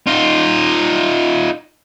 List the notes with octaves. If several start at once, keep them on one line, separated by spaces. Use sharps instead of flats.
D#4 F4